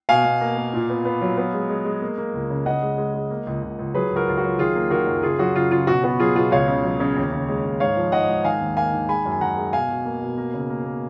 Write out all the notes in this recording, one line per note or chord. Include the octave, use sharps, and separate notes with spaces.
B2 F5 G#5
B2
A#3
A#3
A#2
B3
B3
F#3
B3
G#3
G#3
G#3
A#3
A#3
C#2
C#3
C#3 D#5 F#5
G#3
G#3
G#3
A#3
C#2
C#2
C#2
F#3 G#4 B4
C#2
F#4 A#4
C#2 F4
F#4
F#3
D#3 F4 G#4
A#3
D#3 F#4 A#4
F#2
C#3 F4 G#4
F#3 F#4
C#3 F4
C#3 F4
B2 F#4
B3 F#4
F#3 F4 G#4
B2 F4 G#4
C#2 C#5 F5
C#3
F#3
C#3
D#2
C#3
G#3
D#2
G#2 C#5 F5
F3
G#2 D#5 F#5
G#2
D#3 F5 G#5
D#2
A#3 F5 G#5
D#3
G#3 G#5 B5
F#2
G#5
D#3 F#5 A#5
G#3
B2 F5 G#5
B2
A#3
B2
A#3
C#3
A#3
A#3